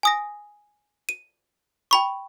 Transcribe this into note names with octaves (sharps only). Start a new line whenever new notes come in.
G#5 D#6 A#6
D#7
G5 B5 C#6